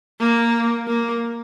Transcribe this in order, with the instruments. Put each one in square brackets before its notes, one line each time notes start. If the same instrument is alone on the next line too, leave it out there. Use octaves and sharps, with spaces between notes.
[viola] A#3
A#3